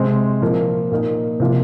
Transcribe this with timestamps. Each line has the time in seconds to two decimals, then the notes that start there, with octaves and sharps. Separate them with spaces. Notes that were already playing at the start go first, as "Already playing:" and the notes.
Already playing: C3 G#3 C4
0.42 A#2 F3 A#3
0.92 A#2 A#3 D#4
1.40 C3 F3 A#3 F4